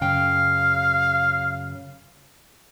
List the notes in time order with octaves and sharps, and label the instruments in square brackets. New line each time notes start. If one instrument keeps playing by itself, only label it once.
[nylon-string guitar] F#2 C#3 G5 [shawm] F5